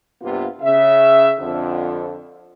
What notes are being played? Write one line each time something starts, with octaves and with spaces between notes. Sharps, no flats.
G2 C3 A#3 B3 F4
C#3 E5
F2 D3